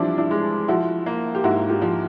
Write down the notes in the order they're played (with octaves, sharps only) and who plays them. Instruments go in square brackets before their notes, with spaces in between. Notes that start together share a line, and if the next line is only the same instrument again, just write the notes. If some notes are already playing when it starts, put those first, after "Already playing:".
Already playing: [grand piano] E3 F3 G3 [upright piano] C4 D4 E4
[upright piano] D4 E4
[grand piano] G#3
[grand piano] F3 [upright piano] E4 F#4
[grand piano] A#3
[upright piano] G4
[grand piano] G#2 [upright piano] E4 F#4
[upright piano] F4 G4
[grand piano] F3